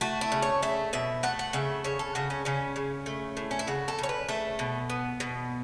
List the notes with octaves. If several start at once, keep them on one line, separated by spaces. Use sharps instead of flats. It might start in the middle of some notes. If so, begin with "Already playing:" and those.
A3 F#4
E4
C#3
C#5
A3 E5
B2 E5
A3 F#5
F#5
C#3 E5
C#3 C#5
A4
C#3 F#4
C#4
C#3 C#4
C#3
A3
A2
C#4
E4
C#3 F#4
A4
C#3 C#5
B4
A3 E5
B2
B3
B2